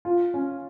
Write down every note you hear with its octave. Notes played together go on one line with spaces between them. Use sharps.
F4
C#4